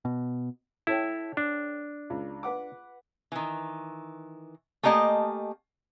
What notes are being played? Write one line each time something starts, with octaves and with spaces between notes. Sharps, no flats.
B2
E4 A4 C#5 G5
D4
C#2
B4 F#5 D6
D#3 E3
A3 A#3 G4 D#5 G#5 A5